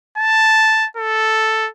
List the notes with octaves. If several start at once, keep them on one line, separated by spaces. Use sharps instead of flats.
A5
A4